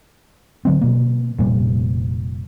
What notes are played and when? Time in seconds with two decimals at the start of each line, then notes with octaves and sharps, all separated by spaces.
0.65 D3 F#3 C4
0.81 B2 A#3
1.39 F1 A#2 G3